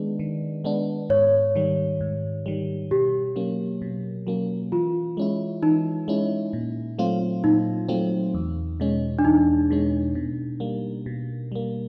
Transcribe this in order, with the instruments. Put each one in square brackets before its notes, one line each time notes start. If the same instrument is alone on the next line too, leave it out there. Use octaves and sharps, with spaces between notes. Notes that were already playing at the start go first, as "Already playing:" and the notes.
Already playing: [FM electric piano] D#3 G#3 B3 D4
D#3
G#3 B3 D4
[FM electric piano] G#2 [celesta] C#5
[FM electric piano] D#3 G3
G#2
D#3 G3
[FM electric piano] B2 [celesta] G4
[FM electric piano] F#3 A#3 C#4
B2
F#3 A#3 C#4
[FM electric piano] E3 [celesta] F4
[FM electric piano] G#3 C#4 E4
[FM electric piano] E3 [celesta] D#4
[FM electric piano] G#3 C#4 E4
A#2
F#3 A3 C4 F4
[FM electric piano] A#2 [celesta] D#4
[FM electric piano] F#3 A3 C4 F4
E2
B2 G#3 C#4
[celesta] D4
[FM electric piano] E2 [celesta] D#4
[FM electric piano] B2 G#3 C#4
B2
G3 A#3
B2
G3 A#3